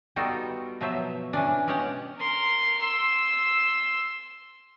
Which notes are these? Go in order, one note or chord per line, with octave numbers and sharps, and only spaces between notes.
G3 B3 D#4 F4 F#4 A4
B2 F3 F#3 C5 E5
E3 C#4 D4
B2 G#3 C#4 G4 C#5 F#5
A#4 C6
C6 E6